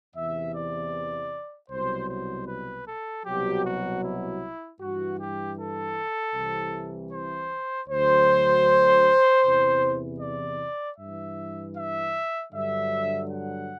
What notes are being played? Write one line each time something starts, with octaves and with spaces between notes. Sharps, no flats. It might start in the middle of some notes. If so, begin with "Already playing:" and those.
E2 C3 E3 E5
D5
C2 B2 F#3 C5
C5
B4
A4
C2 B2 F#3 G4
F#4
E4
G2 E3 F#4
G4
A4
C2 C3 E3
C5
D2 D3 F#3 C5
E2 C3 E3
D5
G2 E3 E5
E5
G2 D3 F#3 E5
F#5